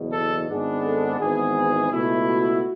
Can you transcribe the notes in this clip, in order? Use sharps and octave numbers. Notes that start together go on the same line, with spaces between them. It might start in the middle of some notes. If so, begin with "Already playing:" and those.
Already playing: F#1 E2 B2
A4
G#1 G#2 G#3 B3 D4
A4
G#1 G#2 E3 B3 G#4
C#2 B2 A3 E4
F#4